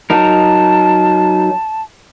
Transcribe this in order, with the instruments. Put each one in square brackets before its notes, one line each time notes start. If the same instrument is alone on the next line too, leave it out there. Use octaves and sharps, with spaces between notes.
[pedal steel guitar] F#3 D#4 A#4 [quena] A5